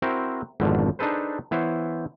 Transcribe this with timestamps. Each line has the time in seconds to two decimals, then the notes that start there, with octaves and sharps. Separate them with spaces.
0.02 C4 E4 F#4 A#4 C5
0.60 G#1 F2 B2 D3 F3
0.99 D4 D#4 G#4 A4 B4 C5
1.51 E3 B3 E4 C5 C#5